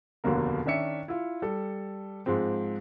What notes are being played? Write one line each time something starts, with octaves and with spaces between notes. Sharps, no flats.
F1 D#2 B2 D3 A#3 A#4
D#3 C#4 D4 E5 C#7
E4 F4
G3 A4
G#2 F3 G#3 C4